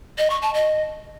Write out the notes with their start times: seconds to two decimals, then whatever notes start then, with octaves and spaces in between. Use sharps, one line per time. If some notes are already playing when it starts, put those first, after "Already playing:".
0.18 D#5
0.30 C#6
0.42 A5
0.54 D#5